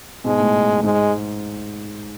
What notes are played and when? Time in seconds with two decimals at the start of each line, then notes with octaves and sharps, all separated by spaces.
0.25 G#2 B2 G#3
0.40 A2
0.83 G#2 G#3